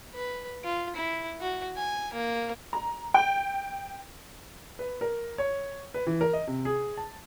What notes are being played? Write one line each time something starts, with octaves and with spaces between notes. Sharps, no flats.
B4
F4
E4
F#4
G#5
A#3
A#5
G5
B4
A#4
C#5
B4
E3
A#4
D#5
C3
G#4
A5